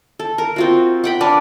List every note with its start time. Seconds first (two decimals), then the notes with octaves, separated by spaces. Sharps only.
0.19 A4
0.38 A#4
0.56 C4 F4 F#4
1.04 F#5 G5 B5
1.21 D4 A#4 B4 D5